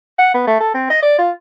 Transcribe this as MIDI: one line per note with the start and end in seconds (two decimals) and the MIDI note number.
0.19 0.32 78
0.34 0.44 59
0.48 0.60 57
0.60 0.70 69
0.74 0.86 60
0.90 0.99 75
1.03 1.17 74
1.19 1.31 65